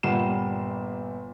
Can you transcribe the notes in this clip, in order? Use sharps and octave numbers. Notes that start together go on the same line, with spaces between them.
G1 A#2 G3 F#5 C7 E7